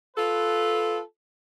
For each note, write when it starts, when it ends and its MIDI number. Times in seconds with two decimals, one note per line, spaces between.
0.17 1.00 65
0.17 1.00 69
0.17 1.00 71